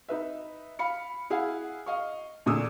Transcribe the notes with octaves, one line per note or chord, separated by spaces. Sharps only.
D#4 B4 E5
F5 B5 C#7
E4 G#4 F5 F#5
D#5 F5 C#6
E2 A#2 D3 D#6 E6